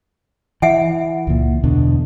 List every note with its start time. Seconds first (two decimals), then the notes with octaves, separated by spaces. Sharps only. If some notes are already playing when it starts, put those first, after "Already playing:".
0.62 E3 E5 F#5 G#5
1.27 C#2 A#2
1.64 E2 B2 D3